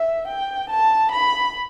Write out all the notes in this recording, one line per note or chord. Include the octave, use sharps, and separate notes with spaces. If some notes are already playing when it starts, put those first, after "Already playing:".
Already playing: E5
G5
A5
B5